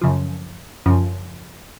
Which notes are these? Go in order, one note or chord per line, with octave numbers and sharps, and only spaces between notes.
F#2 C#3 F3
F#2 C#3 F3